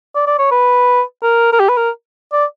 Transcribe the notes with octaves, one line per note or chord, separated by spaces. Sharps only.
D5
D5
C#5
B4
A#4
A#4
G4
B4
A#4
D5